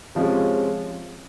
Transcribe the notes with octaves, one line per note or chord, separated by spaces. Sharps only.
C3 F3 G#3 C#4